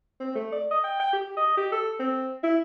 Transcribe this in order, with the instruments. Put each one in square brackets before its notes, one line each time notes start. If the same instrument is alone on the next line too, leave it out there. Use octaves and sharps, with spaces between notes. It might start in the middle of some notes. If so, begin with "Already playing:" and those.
[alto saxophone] C4
A3
D5
D#5
G5
G5
G4
D#5
G4
A4
C4
E4